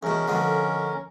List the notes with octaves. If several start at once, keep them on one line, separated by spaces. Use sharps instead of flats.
E2 B2 C#4 A#4
F2 B2 D3